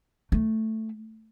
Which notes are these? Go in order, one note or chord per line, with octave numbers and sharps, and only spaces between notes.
A3